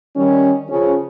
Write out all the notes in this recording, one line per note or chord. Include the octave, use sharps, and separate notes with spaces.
D#3 G3 C#4
C#3 F3 C#4